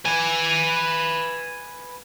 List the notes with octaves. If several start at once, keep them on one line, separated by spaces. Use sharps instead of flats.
B4 G#5